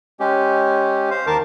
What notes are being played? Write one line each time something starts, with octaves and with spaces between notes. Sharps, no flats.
G#3 C#4 G4
C5 F5
D#2 D#3 A#4 A5 D6